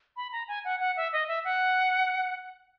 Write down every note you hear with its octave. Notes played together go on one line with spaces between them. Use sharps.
B5
A#5
G#5
F#5
F#5
E5
D#5
E5
F#5